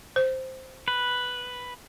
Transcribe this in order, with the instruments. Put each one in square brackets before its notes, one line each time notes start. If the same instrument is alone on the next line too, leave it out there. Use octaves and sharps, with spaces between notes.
[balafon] C5
[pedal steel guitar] B4